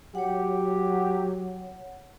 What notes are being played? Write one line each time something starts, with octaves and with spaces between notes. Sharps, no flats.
F#3 G4 C#5 F#5